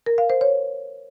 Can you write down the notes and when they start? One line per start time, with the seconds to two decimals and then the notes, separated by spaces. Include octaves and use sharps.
0.06 A#4
0.18 F5
0.30 C5
0.41 C#5